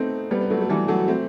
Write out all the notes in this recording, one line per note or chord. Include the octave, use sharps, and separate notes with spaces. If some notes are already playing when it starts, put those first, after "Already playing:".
Already playing: A3 B3 C4 D#4
G3 B3
B3
F#3 A3
A3
E3 G3
F#3 A3
A3 C4